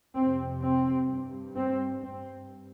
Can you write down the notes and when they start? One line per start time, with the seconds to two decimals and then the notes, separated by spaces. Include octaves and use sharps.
0.14 F2 C3 C4
0.62 C4
1.09 G2
1.56 C4
2.04 G2 C4